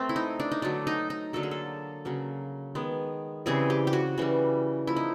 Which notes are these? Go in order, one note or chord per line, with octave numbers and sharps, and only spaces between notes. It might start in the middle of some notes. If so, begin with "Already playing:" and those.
Already playing: A3 C4
E4
D#4
D4
D#4
D3 F#3 A3 D4
D#4
D#4
D3 F#3 A#3 A4
G#4
A4
C#3 F#3 A#3
D#3 G#3 B3
C#3 E3 G3 C4 G#4
G4
G4
F#4
C#3 E3 G3
F3 A#3 E4
D#4